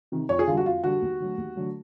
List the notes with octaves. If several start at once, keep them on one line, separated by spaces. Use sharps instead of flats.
C3 D#3
F2 C#5
G#4
D3 G3 F4
F#4
F2 F4
D3 G3 F#4
D#2
D3 F#3 A3
D#2
D3 F#3 A3